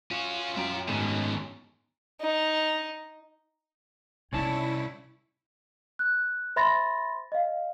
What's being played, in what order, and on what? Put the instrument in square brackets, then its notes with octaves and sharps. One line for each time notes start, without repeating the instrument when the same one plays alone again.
[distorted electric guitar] C#4 F#4 [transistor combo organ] F4
[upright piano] F#2 [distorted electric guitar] E5 G5
[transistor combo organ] G#2 D#3 [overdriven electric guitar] B2 [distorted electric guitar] A3 C#4
[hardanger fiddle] D#4
[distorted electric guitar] C2 C#5 [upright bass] C3 D#4 [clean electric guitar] C#4 D5 A5 [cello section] E4
[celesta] F#6
C5 E5 B5 C6 A6 A#6
D#5 F5